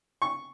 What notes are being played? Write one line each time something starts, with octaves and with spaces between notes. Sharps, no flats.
C#6